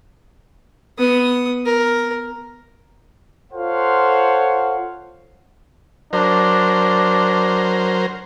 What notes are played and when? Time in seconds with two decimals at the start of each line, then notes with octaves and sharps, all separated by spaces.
0.98 B3 D#6
1.65 A#4
3.53 F4 A4 C5 C#5 F5 F#5
6.13 F#3 D4 A#4 C5